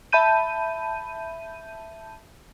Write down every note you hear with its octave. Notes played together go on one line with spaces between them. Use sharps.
E5 A5 B5 G6 D#7